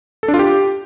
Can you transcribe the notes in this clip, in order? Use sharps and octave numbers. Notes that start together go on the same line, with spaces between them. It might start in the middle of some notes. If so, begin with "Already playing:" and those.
A4
D4
F4
G4